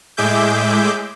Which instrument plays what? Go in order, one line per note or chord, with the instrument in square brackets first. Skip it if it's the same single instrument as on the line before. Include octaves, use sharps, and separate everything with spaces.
[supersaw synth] A2 G#3 G#4 E5 D6 G6